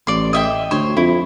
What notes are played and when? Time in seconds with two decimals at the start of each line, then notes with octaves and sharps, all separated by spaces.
0.07 A1 D5 C6
0.33 D#5 E5 G5
0.71 D2 C5 C#5
0.97 F2 E4